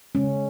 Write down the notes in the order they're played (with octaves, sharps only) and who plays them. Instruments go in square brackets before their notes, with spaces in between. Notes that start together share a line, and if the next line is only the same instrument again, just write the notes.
[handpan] C#3 G#3 C#4